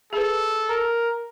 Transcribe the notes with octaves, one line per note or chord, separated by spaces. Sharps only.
G#4 A4 B4
A#4